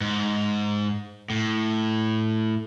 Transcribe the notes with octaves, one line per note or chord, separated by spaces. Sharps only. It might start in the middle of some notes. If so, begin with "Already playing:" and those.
G#2
A2